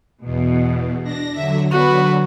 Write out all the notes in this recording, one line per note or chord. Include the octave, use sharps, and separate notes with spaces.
E2 B2
D4 A#6
D3 F#3 E5
B3 F#4 B4